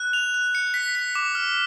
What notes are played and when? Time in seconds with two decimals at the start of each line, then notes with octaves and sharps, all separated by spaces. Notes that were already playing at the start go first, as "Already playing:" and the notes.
Already playing: F#6
0.13 F7
0.34 F#6
0.55 C#7
0.74 B6
0.95 B6
1.15 D6
1.35 F6